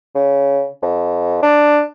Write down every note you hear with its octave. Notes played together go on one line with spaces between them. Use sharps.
C#3
F2
D4